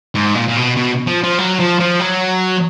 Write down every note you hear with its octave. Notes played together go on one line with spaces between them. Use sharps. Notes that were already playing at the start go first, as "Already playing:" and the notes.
G#2
A#2
A#2
B2
B2
F3
F3
F#3
F3
F3
F#3